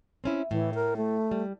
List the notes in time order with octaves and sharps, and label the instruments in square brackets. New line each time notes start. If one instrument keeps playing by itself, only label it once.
[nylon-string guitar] C4 C#4 E4
[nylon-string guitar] A2 [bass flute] E3
[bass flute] A#4
A3
[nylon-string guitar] G3